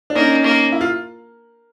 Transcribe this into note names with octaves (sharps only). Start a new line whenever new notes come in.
D4
A#3 C#4 D#4
A#3
E4
F4